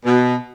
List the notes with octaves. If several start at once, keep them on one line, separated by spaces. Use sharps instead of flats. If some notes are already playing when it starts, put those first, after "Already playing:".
B2